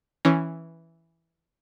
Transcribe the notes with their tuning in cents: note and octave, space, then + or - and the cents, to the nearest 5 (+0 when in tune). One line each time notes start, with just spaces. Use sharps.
E3 +0 C#4 -5